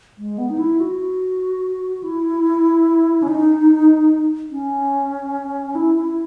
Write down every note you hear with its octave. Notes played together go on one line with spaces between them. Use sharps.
G#3
B3
D#4
E4
F#4
E4
C#4
D#4
C#4
E4
E4